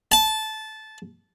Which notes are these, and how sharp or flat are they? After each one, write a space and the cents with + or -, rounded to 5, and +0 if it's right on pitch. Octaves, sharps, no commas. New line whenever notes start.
A5 -15